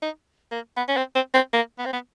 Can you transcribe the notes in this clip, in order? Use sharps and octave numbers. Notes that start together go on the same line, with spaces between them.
D#4
A#3
B3
C#4
C4
C4
C4
A#3
B3
C4
B3